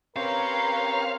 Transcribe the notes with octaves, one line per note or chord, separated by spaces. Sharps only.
C4 C#4 G4 A#4 B4 C#5 F5 A#5